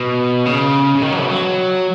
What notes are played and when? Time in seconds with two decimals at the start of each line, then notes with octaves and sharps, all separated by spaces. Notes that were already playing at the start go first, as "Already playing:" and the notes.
Already playing: B2
0.45 C#3
0.95 C#3
1.02 D#3
1.12 F#3
1.21 B2
1.30 F#3